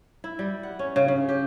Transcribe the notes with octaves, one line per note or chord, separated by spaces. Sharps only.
E4
G3
F#5
C#4
C#3
C#3
G4